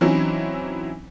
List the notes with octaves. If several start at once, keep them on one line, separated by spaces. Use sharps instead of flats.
E3 F#3 C4 C#4 D#4 E4